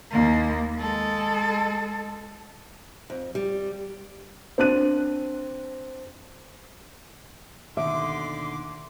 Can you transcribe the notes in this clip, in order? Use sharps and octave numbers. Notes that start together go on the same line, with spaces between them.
D#2 A#3
G#3 A4
F2
G3
C4 D4 F#6 D#7
D#2 B2 D3 D#3 E5 C6 D6